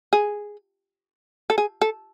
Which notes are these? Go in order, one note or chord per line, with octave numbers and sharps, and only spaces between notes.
G#4
A4
G#4
A4